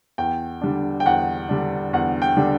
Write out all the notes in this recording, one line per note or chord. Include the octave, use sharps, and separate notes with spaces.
E2 G5
D3 G3 D4
G5
E2 F#5
D3 G3 D4
E2 F#5
G5
D3 G3 D4